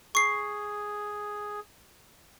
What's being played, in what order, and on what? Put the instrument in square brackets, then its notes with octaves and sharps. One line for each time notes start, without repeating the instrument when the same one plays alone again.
[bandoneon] G#4 [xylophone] C#6 C7